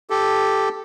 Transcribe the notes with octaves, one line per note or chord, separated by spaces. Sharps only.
G4 A4